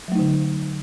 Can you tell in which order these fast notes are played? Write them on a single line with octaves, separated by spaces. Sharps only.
F#3 A3 D#4 D3